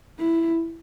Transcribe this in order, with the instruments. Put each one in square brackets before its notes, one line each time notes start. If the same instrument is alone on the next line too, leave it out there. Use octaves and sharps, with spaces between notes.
[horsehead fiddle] E4